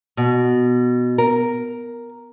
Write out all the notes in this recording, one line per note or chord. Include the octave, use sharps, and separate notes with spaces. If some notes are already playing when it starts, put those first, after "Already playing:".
B2
A#4